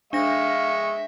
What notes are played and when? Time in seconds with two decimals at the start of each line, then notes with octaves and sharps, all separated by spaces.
0.13 G#3 D4 E5 F5 C#6 A#6